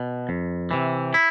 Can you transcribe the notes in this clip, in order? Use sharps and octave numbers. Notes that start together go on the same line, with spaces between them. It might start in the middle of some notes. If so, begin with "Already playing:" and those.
Already playing: B2
F2
C3 E3
E4